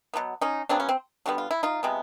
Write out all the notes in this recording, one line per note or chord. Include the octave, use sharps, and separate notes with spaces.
B2 F#3 B3
C#4 D#4
C#3 F#3 B3 C4 D4
C#4
C4
D3 G3 B3 F#4
F4
E4
D#4 F4
C3 F3 G#3 B3